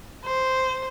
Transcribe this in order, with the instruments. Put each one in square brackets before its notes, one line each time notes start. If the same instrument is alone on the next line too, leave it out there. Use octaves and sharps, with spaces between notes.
[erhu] C5